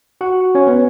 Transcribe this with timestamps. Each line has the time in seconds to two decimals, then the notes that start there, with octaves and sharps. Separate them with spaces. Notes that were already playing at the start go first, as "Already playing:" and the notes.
0.21 F#4 F#5
0.55 C#4 C#5
0.67 B3 B4